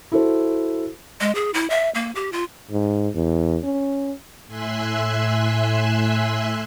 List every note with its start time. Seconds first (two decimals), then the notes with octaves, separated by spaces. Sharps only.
0.12 E4 F#4 A4 C5
1.21 G#3
1.35 G#4
1.54 E4
1.70 E5
1.95 A#3
2.15 G4
2.32 F4
2.71 G#2
3.15 E2
3.64 C#4
4.47 A2 E5 G#5 C6 E6 F#6